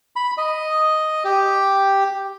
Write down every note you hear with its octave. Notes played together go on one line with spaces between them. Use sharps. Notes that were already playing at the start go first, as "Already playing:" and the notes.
B5
D#5
G4